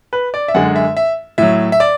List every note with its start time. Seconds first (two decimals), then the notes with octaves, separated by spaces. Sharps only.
0.13 B4
0.34 D5
0.48 E5
0.54 F#2 D3 G#3 F#5
0.76 E5
0.97 E5
1.38 A2 F#3 E5
1.72 E5
1.80 D5